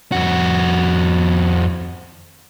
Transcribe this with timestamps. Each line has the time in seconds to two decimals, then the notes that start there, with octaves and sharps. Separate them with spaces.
0.12 F2 F#4